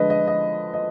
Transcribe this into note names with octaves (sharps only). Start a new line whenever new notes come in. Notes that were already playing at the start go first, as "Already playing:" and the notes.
Already playing: D3 F3 G#3 B4 D#5
D#5
D#5
D#5